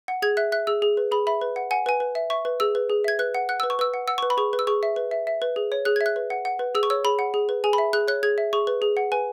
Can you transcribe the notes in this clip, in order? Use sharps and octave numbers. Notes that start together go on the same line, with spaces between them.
F#5
G#4 G#6
E5 F#6
E5 F#6
G#4 E6
G#4
B4
G#4 B5
E5 B5
B4
F#5
F#5 G#5
B4 G#5
B4
E5
E5 C#6
B4
G#4 E6
B4
G#4
E5 G#6
B4 F#6
F#5
F#5 F#6
B4 E6
C#6
B4 E6
F#5
F#5 E6
C#6
B4
B5
G#4 C#6
B4
E6
G#4 C#6
E5
B4
E5
E5
B4
G#4
C#5
G#4 F#6
G#6
E5
F#6
B4
F#5
F#5
B4
G#4 E6
C#6
C#5 E6
G#4 B5
F#5
G#4
B4
G#4 G#5
B5
E5
G#4 F#6
C#5 F#6
G#4 G#6
E5
G#4 C#6
B4
G#4
F#5
B4 G#5